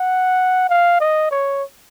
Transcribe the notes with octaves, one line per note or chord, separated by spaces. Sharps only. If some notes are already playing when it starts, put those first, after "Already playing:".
Already playing: F#5
F5
D#5
C#5